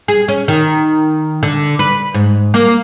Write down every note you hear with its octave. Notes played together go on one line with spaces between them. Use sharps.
G#4
C#4
D#3
D3
B4
G#2
A#3